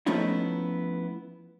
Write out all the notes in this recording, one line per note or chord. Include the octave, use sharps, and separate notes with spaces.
F3 A3 B3 C#4 D#4 E4